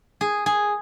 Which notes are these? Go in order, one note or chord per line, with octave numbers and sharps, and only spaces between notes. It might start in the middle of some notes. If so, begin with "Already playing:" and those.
G#4
G#4